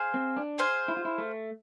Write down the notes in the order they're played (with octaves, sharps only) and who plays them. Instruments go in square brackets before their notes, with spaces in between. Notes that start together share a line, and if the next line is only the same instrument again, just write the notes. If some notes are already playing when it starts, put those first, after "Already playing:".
Already playing: [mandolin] G#4 C5 F5 G#5
[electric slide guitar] C4
D4
[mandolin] G#4 C5 F5 G#5
[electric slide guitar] E4
F4
E4
A3